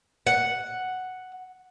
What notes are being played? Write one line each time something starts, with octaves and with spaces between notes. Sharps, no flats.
F#5